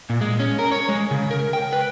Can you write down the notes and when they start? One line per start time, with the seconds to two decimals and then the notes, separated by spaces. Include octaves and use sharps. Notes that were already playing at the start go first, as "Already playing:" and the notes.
0.10 A#2
0.21 G#3
0.39 C#4
0.59 A#4
0.72 C#5
0.89 G#3
1.11 C#3
1.31 A#4
1.53 G5
1.73 B4